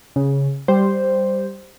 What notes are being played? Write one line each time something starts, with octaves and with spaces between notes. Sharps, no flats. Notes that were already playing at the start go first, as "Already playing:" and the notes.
C#3
G3 C5